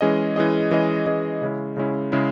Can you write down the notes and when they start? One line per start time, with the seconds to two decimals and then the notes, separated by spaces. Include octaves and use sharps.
0.01 E3 G#3 C#4 G#4 D#5
0.36 E3 G#3 C#4 G#4 D#5
0.71 E3 G#3 C#4 G#4 D#5
1.06 E3 G#3 C#4 G#4 D#5
1.42 C#3 G#3 C#4 E4
1.77 C#3 G#3 C#4 E4
2.12 C#3 G#3 C#4 E4